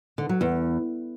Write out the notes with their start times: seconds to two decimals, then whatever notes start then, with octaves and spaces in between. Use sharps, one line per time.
0.18 D3
0.29 F#3
0.41 E2